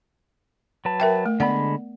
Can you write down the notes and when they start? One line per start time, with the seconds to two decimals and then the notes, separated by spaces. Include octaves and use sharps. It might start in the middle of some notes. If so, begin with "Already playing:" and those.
0.85 F#3 B4 A5
1.00 A#4 E5 G5
1.26 A3
1.40 D3 G#3 B3 D5 F#5 B5